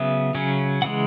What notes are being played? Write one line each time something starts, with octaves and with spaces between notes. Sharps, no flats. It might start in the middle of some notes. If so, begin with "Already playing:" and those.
Already playing: C#3 F#3 B3 E5
C#3 F#3 C#4
C#3 E3 G#3 F#5